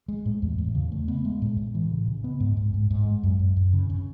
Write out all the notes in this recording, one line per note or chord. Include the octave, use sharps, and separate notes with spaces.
G#3
A2
E2
E2
C#3
A3
B3
G#3
A2
A2
E3
C#3
C#3
B3
G#2
G#2
G#2
G#2
G#3
F#2
F#2
F#2
C#3
C#3